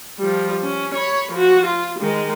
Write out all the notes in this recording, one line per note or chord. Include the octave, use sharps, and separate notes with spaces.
F3 G3
C#4
C#5 B5
F3 F#4
F4
D#3 G#3